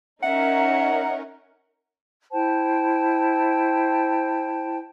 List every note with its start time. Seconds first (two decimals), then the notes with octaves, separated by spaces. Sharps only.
0.23 C#4 D#4 A#4 E5 F#5
2.32 E4 C5 G5 A5